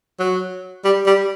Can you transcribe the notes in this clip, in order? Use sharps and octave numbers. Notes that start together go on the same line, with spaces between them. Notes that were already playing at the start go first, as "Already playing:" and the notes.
F#3
G3
G3